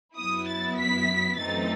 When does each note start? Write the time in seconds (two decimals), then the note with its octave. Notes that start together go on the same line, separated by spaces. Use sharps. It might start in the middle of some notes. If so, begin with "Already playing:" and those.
0.16 F#2 F#3 B3 E4 D#6
0.47 A6
0.77 B6
1.38 F#2 E3 A3 C4 D#4 A6